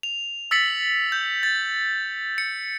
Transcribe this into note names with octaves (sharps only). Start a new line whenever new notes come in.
F7
E6 A6 B6 C#7 F#7
G6
A6
C#7